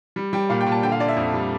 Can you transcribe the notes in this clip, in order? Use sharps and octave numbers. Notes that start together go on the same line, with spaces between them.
G3
G3 G5
A#2 F5
G5
A#2
A5
D3 G5
F5
D3 D5
E5
F2
G3